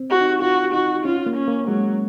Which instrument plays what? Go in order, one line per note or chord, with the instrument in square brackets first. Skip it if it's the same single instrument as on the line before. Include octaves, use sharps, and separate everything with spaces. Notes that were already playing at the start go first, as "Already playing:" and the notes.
Already playing: [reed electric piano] C4
[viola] F#4
[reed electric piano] D#4
[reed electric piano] F4 [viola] F#4
[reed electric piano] D#4 [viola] F#4
[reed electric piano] C#4 [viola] F4
[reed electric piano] A#3
[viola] C#4
[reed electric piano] A#3
[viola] F#3 [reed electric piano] G#3